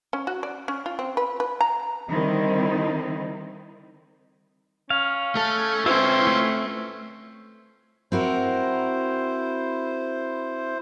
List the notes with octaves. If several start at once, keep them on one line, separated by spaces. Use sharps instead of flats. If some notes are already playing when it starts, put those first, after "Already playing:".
C#4
F#4
D5
C#4
F4
C4
B4
B4
A#5
D3 D#3 G3 C4 D#4 E4
C#4 F5
A3 A4
C4 E4 F4 B4
A3
C4 E4 F#4 A#4 C5